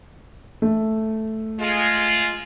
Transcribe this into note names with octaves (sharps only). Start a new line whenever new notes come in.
A3
G#3 F4